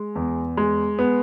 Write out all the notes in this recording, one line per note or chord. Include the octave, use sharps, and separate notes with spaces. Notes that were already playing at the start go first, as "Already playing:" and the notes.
Already playing: G#3
E2
G#3
B3